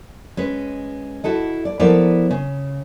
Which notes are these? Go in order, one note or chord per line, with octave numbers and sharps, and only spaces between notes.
G#3 C#4 B4
E4 F#4 A4 D#5
D5
F3 B3 E4 A4 A#4 D5
C#3